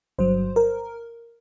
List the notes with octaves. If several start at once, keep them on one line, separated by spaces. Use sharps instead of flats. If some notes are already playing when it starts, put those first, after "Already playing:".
G1 G2 F#3 C5
A#4